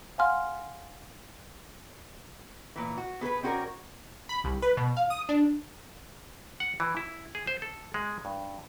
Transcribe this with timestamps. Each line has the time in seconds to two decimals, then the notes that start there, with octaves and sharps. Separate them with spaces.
0.18 F5 F#5 G#5 C6 F6
2.76 A#2 E3
2.98 F#4
3.21 B3 G#4 A4 B4
3.43 C4 C#4 F#4 G#4 A#4 D5
4.29 B5
4.44 C2
4.62 B4
4.77 B2
4.97 F5
5.10 D#6
5.29 D4
6.60 F#5
6.80 E3
6.97 E4
7.35 G#4
7.47 C5
7.62 A4
7.94 G#3
8.25 G2